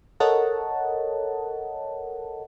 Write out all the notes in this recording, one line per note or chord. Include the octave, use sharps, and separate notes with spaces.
A4 A#4 C#5 D#5 F#5 A5